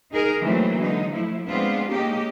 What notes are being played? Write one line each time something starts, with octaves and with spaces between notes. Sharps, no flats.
D#4 G#4 A#4
D#3 E3 F#3 A3 A#3 C4
D3 G#3 D#4
F3 A3 E4
G#3 B3 C4 D4 F4
G#3 A#3 C#4 D#4 G4